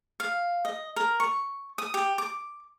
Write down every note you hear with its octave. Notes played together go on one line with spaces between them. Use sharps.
F5
D#5
A#4
C#6
D#6
G4
D6